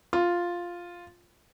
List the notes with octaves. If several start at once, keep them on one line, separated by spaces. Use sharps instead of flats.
F4